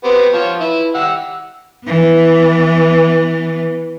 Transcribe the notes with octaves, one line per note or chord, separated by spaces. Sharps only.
B3 C4 G4
F3 C#5
E4 B4
G4 F#5 E6
E3 B3